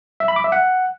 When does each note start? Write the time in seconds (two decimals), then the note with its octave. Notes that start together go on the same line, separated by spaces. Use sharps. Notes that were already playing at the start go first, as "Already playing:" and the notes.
0.20 E5
0.28 B5
0.36 D6
0.44 E5
0.52 F#5